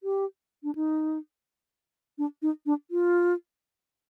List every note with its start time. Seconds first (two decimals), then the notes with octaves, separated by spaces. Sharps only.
0.03 G4
0.64 D4
0.75 D#4
2.18 D4
2.42 D#4
2.66 D4
2.91 F4